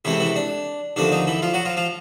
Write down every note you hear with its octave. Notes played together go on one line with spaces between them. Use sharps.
C#2 C3 E3 A3 C4 E4
E3 E4
D4
D#2 D3 F3 A3 C4 D4
D#4
E3 E4
F3 F4
F#3 F#4
F3 F4
F3 F4